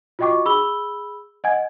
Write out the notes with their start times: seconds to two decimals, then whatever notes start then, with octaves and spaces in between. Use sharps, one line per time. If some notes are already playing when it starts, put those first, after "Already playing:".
0.19 F4 F#4 D#5 G5 C#6 D6
0.45 G#4 B5 E6 G7
1.44 D#5 F#5 G#5 G#6